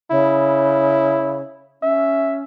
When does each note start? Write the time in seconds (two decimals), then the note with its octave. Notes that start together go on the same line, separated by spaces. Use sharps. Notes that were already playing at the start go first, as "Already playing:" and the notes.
0.11 C#3 E4
1.82 C#4 E5